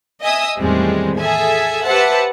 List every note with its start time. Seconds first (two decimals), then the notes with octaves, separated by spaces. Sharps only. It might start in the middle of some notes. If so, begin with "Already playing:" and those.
0.22 D#5 E5 G#5 D#6 E6
0.59 E2 A2 D#3 G3 G#3 C4
1.17 G#4 A4 E5 G#5
1.85 G4 B4 C5 E5 F#5 A5